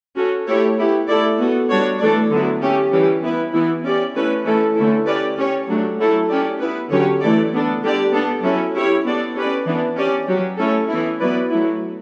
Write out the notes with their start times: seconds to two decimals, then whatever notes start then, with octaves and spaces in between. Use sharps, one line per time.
0.16 C#4 F#4 A4
0.47 A3 E4 G4 C#5
0.78 B3 E4 G4
1.08 A3 E4 A4 D5
1.38 B3 F#4 A4
1.70 G3 D4 F#4 C#5
2.00 E3 A3 D4 A4 D5
2.31 D3 F#3 B3 E4
2.62 A3 C#4 G4
2.93 E3 G3 C#4 G4
3.23 B3 E4 B4
3.54 E3 B3 E4
3.84 C#4 G4 D5
4.15 A3 C#4 E4 B4
4.45 E3 A3 C#4 E4 A4
4.76 D3 A3 C#4 E4 A4
5.06 C#4 G4 B4 D5
5.38 C#4 G4 C#5
5.68 F#3 A3 D4
5.99 F#3 A3 E4 A4
6.30 C#4 G4 D5
6.60 B3 E4 B4
6.91 D3 F#3 C#4 G4 C#5
7.21 E3 A3 E4 A4 D5
7.53 B3 D4 A4
7.82 D3 G3 D4 G4 D5
8.13 B3 D4 A4
8.44 F#3 C#4 E4 A4
8.75 C#4 E4 G4 C#5
9.05 B3 D4 A4 D5
9.36 C#4 G4 B4 D5
9.66 E3 B3 D4
9.98 C#4 G4 D5
10.28 F#3 C#4 G4
10.58 A3 C#4 E4 A4 C#5
10.89 E3 B3 E4
11.20 F#3 B3 E4 B4 D5
11.50 F#3 A3 E4